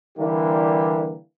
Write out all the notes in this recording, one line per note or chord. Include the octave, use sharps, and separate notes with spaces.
D3 E3 G3 A#3 G4